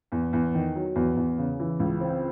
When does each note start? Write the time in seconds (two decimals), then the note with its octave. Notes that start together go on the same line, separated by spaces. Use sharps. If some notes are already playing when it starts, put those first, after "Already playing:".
0.12 E2
0.33 E2
0.54 D#3
0.76 F#3
0.95 E2
1.16 E2
1.38 C#3
1.59 E3
1.80 C#2
2.00 C4